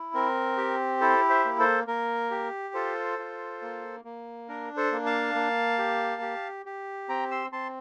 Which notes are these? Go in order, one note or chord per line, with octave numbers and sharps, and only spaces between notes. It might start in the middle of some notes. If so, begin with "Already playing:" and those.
Already playing: E4
C4 A#4
G4
E4 A4 C5
C5 E5
A#3
A4 C5
A#3 A#4
G4
F4 A4 C5
F4
A#3
A#3
D4 A#4
A4 C5
A#3
F5 A5
A#3
G4
G4
G4
C4 G5 A#5
C6 E6
C4 A5 C6